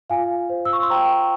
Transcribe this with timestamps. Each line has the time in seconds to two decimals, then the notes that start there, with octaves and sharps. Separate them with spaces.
0.10 F4 F5 G#5
0.49 C5
0.65 E6
0.73 C#6
0.82 C6
0.90 C5 G5 A#5